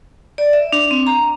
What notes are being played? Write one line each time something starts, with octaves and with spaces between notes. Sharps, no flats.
D5
E5
D4
C4
A#5